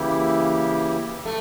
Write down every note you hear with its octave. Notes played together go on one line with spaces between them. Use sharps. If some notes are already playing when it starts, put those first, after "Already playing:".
Already playing: C#3 E3 A#3 E4 G4
A3